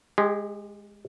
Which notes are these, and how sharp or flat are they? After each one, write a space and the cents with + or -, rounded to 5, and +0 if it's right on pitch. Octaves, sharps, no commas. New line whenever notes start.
G#3 +0 G4 +35